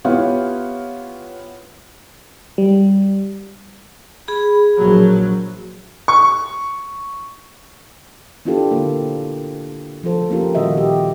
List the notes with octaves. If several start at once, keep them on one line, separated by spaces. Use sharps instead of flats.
B3 E4 F4 G4 C#5 F5
G3
G#4 B5
A#1 F#3
C#6
B3 D4 E4 F4 G4 A4
D3 A#3
F3 A3 F4 A4 C5
A#3 C#4 F4 G4 A#4
A#2 D#3 G3 F#4 D#5 E5
G4